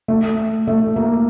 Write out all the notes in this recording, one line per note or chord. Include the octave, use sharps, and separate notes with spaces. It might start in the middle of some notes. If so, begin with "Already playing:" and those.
A3
A3
A#3